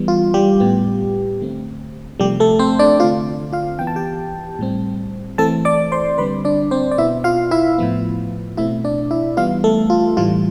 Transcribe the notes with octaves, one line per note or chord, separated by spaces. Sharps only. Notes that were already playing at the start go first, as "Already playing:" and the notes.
Already playing: E3 G3 B3
F4
G3 G4
A2 G3 B3
D3 A3 C4
C3 F3 G3 A3 G4
A3 A4
C4 C5
D4 D5
D3 A3 C4 F4 F5
F4 F5
E3 B3 G5
A5
G4 G5
A2 G3 C4
E3 A3 C4 A4 A5
D5 D6
C5 C6
D3 G3 C4 B4 B5
D4 D5
C4 C5
D5
B2 B3 E4 E5
F4 F5
E4 E5
A2 F3 B3
B2 A3 C4 E4 E5
D4 D5
E4 E5
E3 G3 B3 F4 F5
A3 A4
F4
A2 E3 G3 F4